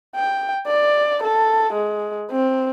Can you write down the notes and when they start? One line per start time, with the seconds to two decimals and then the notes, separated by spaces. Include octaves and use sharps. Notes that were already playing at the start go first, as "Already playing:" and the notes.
0.16 G5
0.67 D5
1.23 A4
1.73 G#3
2.31 C4